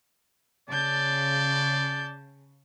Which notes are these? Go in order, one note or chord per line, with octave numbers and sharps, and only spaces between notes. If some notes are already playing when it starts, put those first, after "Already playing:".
C#3 D5 A5 G6